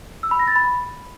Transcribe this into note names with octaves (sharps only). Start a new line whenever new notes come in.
E6
B5
A#6
A6
B5